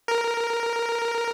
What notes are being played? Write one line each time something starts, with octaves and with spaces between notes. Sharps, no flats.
A#4